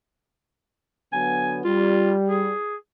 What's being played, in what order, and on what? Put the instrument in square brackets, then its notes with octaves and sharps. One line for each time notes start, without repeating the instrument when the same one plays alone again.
[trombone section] D3 F#3 B3 [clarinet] G#5
[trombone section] G3 [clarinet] F4
[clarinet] G#4